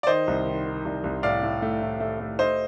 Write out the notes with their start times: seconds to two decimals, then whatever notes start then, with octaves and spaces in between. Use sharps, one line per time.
0.03 D5
0.07 D#3 C5 D#5
0.27 C2
0.46 D#3
0.66 D#3
0.85 C2
1.04 C2
1.23 A2 D5 F5
1.43 A2
1.62 A3
1.82 A2
2.00 A3
2.20 A3
2.39 A3 C5 D#5